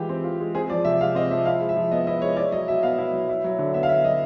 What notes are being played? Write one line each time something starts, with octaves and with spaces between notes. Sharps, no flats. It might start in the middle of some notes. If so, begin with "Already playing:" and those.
Already playing: E3 G#3 F4 G4
C4
F4
G#3
C4 G#4
F3 D5
C3 E5
G#3 F5
C4 D#5
F3 E5
E4 F5
G#3
E5
F3
B3 D#5
E4 D#5
G#3 C#5
E4 D5
F#3 D#5
B2 E5
B3 F5
E4
F#3
E4
F#3
D3
B3 E5
F5
E4 E5
F#3 D#5